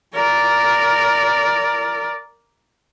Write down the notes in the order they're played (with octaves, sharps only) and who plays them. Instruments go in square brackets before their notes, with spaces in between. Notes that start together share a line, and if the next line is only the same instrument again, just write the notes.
[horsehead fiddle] A#4 D5